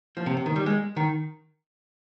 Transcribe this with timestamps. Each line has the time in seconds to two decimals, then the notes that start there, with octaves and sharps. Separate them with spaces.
0.17 F3
0.26 C3
0.37 C3
0.46 D#3
0.56 G3
0.66 G#3
0.96 D#3